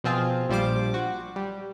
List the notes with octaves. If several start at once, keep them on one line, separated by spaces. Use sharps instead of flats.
B2 F3 C4 F4 G#4
A#1 F3 G3 C5 D6
F#4
G3